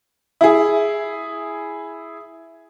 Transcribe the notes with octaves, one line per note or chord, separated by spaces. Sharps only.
E4 G#4